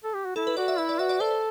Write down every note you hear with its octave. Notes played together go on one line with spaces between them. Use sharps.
A4
G4
F#4
E4 A4
B4
F#4 D5
E5
E4 E5
D5
F#4 E5
D5
A4 C5